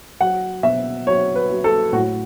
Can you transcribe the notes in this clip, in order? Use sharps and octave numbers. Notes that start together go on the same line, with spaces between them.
F#3 F#5
B2 E5
F#3 C#5
B4
F#3
A4
A2 F#4